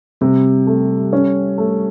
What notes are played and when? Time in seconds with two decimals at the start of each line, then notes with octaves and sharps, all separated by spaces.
0.21 C3 G3
0.67 A3
1.13 C#4
1.58 A3